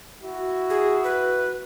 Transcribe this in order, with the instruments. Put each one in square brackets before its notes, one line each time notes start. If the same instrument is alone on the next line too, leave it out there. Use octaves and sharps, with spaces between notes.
[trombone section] E4 F#4
[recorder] G#4
B4